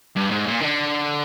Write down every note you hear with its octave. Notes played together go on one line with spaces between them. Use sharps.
G2
G#2
A#2
D3